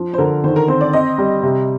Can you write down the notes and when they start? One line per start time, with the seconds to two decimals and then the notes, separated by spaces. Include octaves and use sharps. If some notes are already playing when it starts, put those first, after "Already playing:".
Already playing: F3
0.13 C5
0.18 D3 A#4
0.44 D#3 C5
0.56 A#4
0.68 C4 C5
0.81 D5
0.93 C4 D#5
1.18 G3
1.43 C3